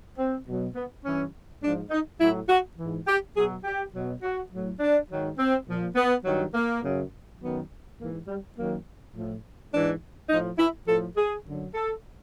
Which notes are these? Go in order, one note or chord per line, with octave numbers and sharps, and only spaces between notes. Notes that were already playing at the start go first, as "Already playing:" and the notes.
C4
B2 F#3
B3
G2 E3 C#4
G#2 F3 D4
D#4
A2 F#3 E4
F#4
G#2 E3
G4
B2 F#3 G#4
G4
B2 F#3
F#4
A2 F#3
D4
G#2 D#3 F#3
C4
A#2 F3
B3
G2 D#3 F#3
A#3
F#2 C#3 F#3
F#2 D#3 F#3 B3
G#2 E3 A#3
G3
F#2 D#3 F#3 A#3
A2 F3
G#2 E3 D4
A2 F3 D#4
E4
A2 F3 A4
G#4
F#2 D3 F#3
A4